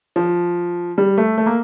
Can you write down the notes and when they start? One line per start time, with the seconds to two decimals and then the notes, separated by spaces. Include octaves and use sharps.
0.16 F3
0.98 G3
1.18 A3
1.38 A3
1.46 A#3